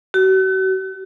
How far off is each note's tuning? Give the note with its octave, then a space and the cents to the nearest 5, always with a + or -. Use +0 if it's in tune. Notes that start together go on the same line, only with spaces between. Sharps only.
F#4 +40